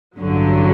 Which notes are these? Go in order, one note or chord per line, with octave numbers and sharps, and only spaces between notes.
A1 G2 D3 F#3